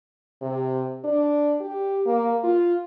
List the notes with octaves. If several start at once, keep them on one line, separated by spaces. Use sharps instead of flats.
C3
D4
G4
A#3
F4